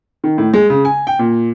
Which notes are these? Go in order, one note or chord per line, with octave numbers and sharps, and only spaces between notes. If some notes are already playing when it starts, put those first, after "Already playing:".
D#3
A2
G#3
C#3
G#5
G5
A#2